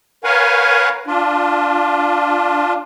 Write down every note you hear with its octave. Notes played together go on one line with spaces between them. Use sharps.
A#4 B4 C#5 F5 F#5 G#5
D4 F4